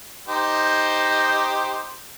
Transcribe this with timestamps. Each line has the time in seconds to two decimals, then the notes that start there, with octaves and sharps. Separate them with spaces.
0.28 D#4 G4 C5